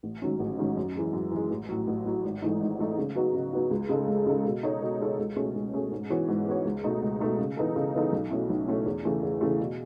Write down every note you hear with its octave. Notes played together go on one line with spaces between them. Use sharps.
A1
G#2 D#3 F#3 C#4
A1
G#2 D#3 F#3 C#4
F#2
E3 G#3
F#2
E3 G#3
A1
A2 F#3
A1
A2 F#3
G#1
G#2 E3 A3 D#4
G#1
G#2 E3 A3 D#4
C#3
F#3 B3 D#4 F#4
C#3
F#3 B3 D#4 F#4
C#2
C#3 G#3 D#4 A4
C#2
C#3 G#3 D#4 A4
B2
G#3 D#4 A4 C#5
B2
G#3 D#4 A4 C#5
C#2
B2 A3 C#4 G#4
C#2
B2 A3 C#4 G#4
G#2
E3 B3 F#4 C#5
G#2
E3 B3 F#4 C#5
C#2
B2 A3 D#4
C#2
B2 A3 D#4
C#3
E3 B3 D#4 A4
C#3
E3 B3 D#4 A4
B1
B2 A3 C#4 E4
B1
B2 A3 C#4 E4
E2
C#3 E3 A3
E2
C#3 E3 A3
B2